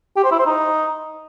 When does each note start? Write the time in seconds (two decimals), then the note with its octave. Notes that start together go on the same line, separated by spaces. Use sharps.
0.16 G4
0.24 C5
0.31 E4
0.39 C5
0.46 D#4